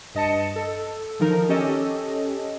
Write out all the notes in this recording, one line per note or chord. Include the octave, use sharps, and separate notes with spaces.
G2 D#5 A5 C#7
A4
D#3 F3 D#4 A#4
C#4 G4 A4 D#5